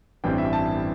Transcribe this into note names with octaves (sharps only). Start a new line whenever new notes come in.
A1 G2 E3 G3 C4 G5
E5
G5
A5